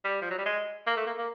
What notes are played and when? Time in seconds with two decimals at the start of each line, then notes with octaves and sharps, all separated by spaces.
0.05 G3
0.22 F3
0.30 F#3
0.38 G3
0.46 G#3
0.87 A#3
0.97 A3
1.06 A#3
1.18 A#3